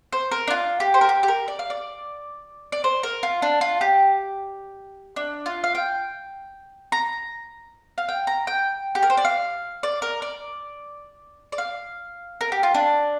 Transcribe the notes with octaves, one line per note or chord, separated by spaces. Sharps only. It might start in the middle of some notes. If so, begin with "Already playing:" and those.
C5
A#4
D4
F4
G4
C5
A#4
G4
G4
A#4
D5
F5
D5
D5
C5
A#4
F4
D4
F4
G4
D4
F4
F5
G5
A#5
F5
G5
A#5
G5
G4
A#4
C5
D5
F5
D5
A#4
D5
D5
F5
A#4
G4
F4
D4